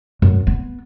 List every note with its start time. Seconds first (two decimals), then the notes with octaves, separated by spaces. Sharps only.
0.22 F#2
0.47 B3